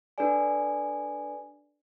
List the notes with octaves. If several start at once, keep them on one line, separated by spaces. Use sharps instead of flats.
D4 G4 A4 B4 D5 G#5